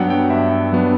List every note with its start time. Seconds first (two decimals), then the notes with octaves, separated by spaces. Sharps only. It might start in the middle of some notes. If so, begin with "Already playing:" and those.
Already playing: G2 F#3 B3 D4 F#5 G5
0.10 G5
0.30 G2 E5
0.73 F#3 B3 D4